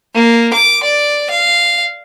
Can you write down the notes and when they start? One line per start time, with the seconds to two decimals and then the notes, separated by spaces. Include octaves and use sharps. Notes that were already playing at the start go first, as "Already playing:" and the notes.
0.15 A#3
0.53 D6
0.84 D5
1.30 F5